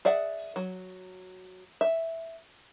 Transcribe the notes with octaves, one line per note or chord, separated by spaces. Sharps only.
G#4 D5 E5 F#5
F#3
E5